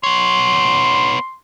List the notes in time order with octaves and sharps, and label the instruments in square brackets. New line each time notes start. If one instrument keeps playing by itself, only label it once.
[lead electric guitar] B3 C#5 [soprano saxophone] C6